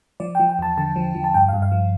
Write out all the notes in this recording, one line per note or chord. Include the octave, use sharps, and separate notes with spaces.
F3 D5
G5
F3
G5
E2 A5
D3 A5
F3
F3
A5
G2 G5
F5
G2
F5
F3